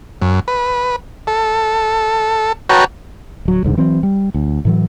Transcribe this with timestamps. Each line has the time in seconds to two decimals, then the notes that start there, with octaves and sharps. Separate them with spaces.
0.22 F#2
0.48 B4
1.27 A4
2.69 F#4 B4 C#5 G5 A5 A#5
3.45 D1 F#3
3.63 D#1 C2 G#2 D3
3.77 E3 F#3 C4
4.03 G3
4.34 D2
4.65 A2 E3 F#3